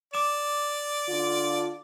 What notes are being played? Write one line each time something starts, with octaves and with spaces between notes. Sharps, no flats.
D5 D6 E7
D3 D4 F4